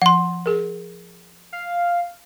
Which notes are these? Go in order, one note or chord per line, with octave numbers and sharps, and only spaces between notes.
F3 F#5 C6
G#4 A#4
F5